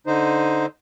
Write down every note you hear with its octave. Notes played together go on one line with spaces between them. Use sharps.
D3 D#4 C5